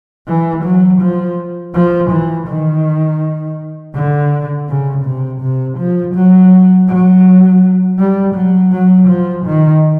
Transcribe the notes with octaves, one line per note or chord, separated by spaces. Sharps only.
E3
F#3
F3
F3
E3
D#3
D3
C#3
C3
C3
F3
F#3
F#3
G3
F#3
F#3
F3
D#3